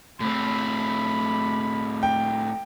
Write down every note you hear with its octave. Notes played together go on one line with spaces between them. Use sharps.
A2 C4 B5
G5